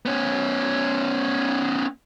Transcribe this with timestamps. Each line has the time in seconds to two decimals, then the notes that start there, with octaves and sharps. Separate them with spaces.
0.06 B3 C#4